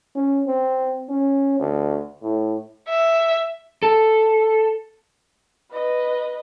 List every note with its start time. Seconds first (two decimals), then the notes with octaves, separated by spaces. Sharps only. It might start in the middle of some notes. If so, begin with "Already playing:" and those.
0.16 C#4
0.47 C4
1.09 C#4
1.59 D2
2.22 A2
2.89 E5
3.83 A4
5.72 B4 D#5